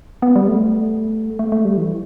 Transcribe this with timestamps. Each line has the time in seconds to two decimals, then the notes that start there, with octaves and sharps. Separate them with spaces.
0.22 B3
0.36 G3
0.48 A3
1.39 A3
1.52 A3
1.65 G3
1.77 E3